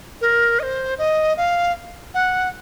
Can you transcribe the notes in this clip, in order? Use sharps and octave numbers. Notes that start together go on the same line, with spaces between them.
A#4
D#5
C5
D#5
F5
F#5